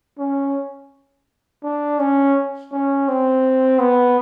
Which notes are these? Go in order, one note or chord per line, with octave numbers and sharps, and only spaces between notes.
C#4
D4
C#4
C#4
C4
B3